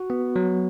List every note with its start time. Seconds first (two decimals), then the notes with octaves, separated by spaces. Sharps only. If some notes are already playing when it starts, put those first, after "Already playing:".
Already playing: F#4
0.10 B3
0.36 F#3